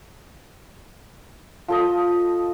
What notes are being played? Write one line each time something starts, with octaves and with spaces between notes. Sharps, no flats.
F3 A4 D#5